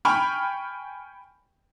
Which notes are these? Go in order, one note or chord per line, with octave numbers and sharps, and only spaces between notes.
G5 G#5 B5 C#6 F6